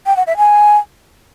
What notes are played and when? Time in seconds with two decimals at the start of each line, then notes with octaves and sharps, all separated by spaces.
0.06 G5
0.17 F#5
0.27 E5
0.37 G#5